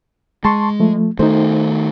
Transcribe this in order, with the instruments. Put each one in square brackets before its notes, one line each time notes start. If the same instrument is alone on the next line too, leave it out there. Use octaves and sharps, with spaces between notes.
[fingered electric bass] G#3 [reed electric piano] A5 C6 C#6
[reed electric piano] F3 A3
[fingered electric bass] D#3 A3 [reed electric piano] D#4 C5